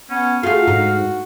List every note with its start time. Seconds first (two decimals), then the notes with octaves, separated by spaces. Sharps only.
0.11 B3 C#4
0.43 A3 F4 F#4 G#4 F5
0.67 G#2 D#4